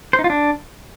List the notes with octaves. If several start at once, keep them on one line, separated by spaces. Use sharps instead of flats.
C5
D#4
F4
D4